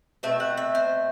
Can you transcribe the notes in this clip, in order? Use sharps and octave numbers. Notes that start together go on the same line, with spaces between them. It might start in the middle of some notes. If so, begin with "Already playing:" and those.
B2 A3 C4 E5
F#5
E5
C5